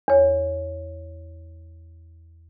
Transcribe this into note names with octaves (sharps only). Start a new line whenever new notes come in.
E2 C#5